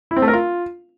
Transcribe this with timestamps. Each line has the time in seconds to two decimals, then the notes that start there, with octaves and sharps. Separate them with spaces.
0.11 E4
0.17 C4
0.22 A3
0.28 A#4
0.33 F4